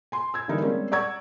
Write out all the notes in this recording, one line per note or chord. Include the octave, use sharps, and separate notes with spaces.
G#5 C6
E6 G#6
D3 E3 G3 D#4 A#4
G3 G#3 A#3 C4 C#4
D5 F#5 A#5 C#6 E6 G#6